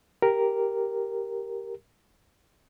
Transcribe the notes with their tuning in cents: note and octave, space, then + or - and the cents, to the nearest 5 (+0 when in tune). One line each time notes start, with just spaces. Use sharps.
G4 +0 A#4 +0